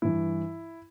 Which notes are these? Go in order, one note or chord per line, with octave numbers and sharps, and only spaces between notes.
G2 E3 E4